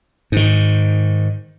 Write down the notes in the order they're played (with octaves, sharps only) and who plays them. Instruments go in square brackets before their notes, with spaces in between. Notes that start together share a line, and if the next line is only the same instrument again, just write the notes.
[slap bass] G#2 D#3